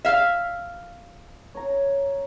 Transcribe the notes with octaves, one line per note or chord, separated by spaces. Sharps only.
E5 F5
C#5 A#5